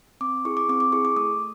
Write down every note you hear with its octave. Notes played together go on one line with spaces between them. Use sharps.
C4 D6
E4 G#4 C#6
D6
C4 D6
D6
E4 G#4 C#6
D6
A3 D#6